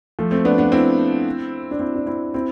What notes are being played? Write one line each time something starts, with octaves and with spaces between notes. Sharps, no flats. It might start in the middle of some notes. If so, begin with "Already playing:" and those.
F3 A3
A3 C4
B3 D4
B3 D4
C4 E4
D4
C4 E4
D4
C4 E4
C4 E4